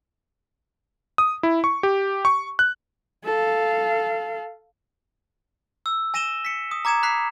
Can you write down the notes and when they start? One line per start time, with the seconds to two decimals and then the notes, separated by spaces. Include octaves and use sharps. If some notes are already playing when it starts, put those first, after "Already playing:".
1.18 D#6
1.43 E4
1.64 C#6
1.83 G4
2.25 C#6
2.59 F#6
3.25 A4 F5
5.86 E6
6.14 G#5 A#6 D#7 E7 G7
6.45 B6 C#7
6.71 D#6
6.85 A#5 D6 G#6 C#7 E7
7.03 B5 F#6 B6 C7